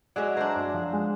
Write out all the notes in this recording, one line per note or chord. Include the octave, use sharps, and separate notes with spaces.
F#3 G#3 D5 E5
D4 C5 A#5
F#2
F3
G#3